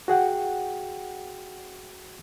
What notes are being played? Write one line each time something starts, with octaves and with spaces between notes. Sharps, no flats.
F#4 G#4 F#5 G5